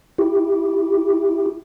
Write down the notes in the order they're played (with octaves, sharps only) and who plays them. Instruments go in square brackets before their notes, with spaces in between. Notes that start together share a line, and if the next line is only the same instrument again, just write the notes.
[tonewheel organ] E4 G4